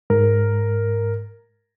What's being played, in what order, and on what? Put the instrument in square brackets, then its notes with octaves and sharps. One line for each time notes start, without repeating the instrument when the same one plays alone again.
[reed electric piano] G#2 [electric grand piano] A#4